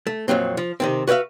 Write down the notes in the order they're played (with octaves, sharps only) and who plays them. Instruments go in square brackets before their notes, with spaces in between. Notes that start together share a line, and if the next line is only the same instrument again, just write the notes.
[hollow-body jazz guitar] A3
F2 A#2 F#3 C4
F3
C3 D#3 C4
F#4 B4 C#5 E5 F5